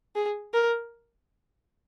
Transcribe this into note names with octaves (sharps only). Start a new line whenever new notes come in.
G#4
A#4